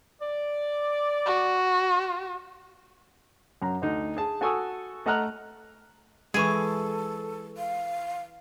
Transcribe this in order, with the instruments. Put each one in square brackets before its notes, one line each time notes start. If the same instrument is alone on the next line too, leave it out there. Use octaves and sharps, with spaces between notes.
[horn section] D5
[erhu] F#4
[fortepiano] F#2 A#5
D2 D#4
G#4 A5
F#4 A4 G#5 C#6 D#6 E6
A3 D#5 F#5 A#5 F6 F#6
[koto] E3 G#4 [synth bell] G#3 C#6 [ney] A4
[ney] F5